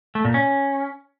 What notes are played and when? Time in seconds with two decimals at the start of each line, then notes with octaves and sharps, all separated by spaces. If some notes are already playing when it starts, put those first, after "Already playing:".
0.15 A3
0.25 A#2
0.34 C#4